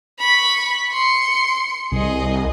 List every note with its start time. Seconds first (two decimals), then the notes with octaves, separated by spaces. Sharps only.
0.19 B5 C#6
0.93 C6 C#7
1.92 C2 G#4 D#5